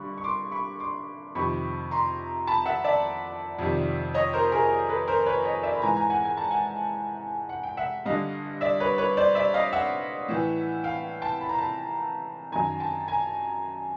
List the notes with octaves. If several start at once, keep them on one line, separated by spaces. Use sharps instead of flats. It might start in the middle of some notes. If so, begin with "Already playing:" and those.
Already playing: G2 D3 B5 C#6
C#6
C6 D6
B5 C#6
C6 D6
F2 C3 D#3 B5 C#6
A#5 C6
A5 B5
E5 F#5
D5 E5
F2 C3 D#3
C#5 D#5
A#4 C5
G#4 A#4
A4 B4
A#4 C5
B4 C#5
C#5 D#5
D5 E5
B5
G#2 E3 G#5 A#5
G#5 A#5
F#5 G#5
G#5
A5
F#5 G#5
F#5
G5
E5 F#5
G2 D3 D#5 F5
D5 E5
B4 C#5
B4 C#5
C5 D5
D5 E5
D#5 F5
E5 F#5
A2 E3
F5 G5
G5 A5
B5
A#5
A5 B5
F#2 D#3 G#5 A#5
G5 A5
G#5 A#5